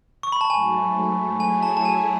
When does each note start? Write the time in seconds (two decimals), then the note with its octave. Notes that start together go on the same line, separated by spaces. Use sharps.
0.23 C#6
0.32 B5
0.41 A5
0.50 G#2 F#3 A3 G#5
1.40 F#3 A3 E4 G#4 C#5 G#5
1.63 A5
1.77 A5
1.85 G#5